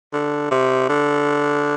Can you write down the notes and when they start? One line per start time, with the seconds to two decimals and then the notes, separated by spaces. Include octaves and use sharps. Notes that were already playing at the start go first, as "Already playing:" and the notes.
0.13 D3
0.51 C3
0.89 D3